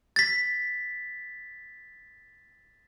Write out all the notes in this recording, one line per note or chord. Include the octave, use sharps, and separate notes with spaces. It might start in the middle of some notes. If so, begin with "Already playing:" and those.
A6 B6